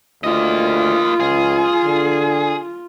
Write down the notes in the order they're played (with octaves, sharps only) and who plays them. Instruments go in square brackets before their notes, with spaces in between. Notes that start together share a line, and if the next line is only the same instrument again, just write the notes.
[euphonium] D2 [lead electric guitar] A#3 D#5 [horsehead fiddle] F4
[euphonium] C#2 [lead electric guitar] G#4
[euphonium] D3